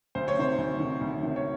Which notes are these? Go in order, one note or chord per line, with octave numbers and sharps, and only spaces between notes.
D2 C5
C#5
C3 D#3 C5
D2
C3 D#3
D2
C3 D#3
C#5